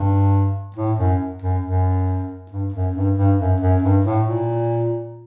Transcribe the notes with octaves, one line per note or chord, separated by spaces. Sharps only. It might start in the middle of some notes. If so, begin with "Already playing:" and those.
Already playing: G2
A2
F#2
F#2
F#2
G2
F#2
G2
G2
F#2
F#2
G2
A2
A#2